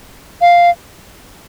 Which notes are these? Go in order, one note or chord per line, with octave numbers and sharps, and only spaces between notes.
F5